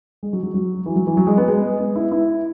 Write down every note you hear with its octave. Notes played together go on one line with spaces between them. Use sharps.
G#3
F#3
F#3
F#3
E3
F#3
E3
F#3
G#3
B3
G#3
B3
E4
E4